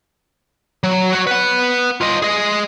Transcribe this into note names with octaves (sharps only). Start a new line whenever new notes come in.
F#3
F#4 C#5
B4 F#5
F4 D#5
G#4 D#5